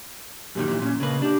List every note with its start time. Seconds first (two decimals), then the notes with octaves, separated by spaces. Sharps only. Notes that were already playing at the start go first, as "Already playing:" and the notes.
0.55 F#2 A#2 D#3 G4
0.68 A#2 E3
0.82 A#2 C#4
1.00 C#3 A#3 B4
1.22 D4 G4